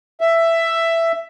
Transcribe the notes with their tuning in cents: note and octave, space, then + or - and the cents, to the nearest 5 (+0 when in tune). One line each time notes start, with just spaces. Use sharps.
E5 +10